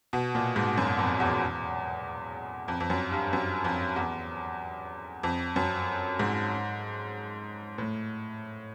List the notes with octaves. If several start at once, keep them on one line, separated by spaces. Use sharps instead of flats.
B2
A#2
G#2
F#2
F2
E2
F2
F2
F#2
G2
F#2
F2
E2
F2
F#2
G#2
A2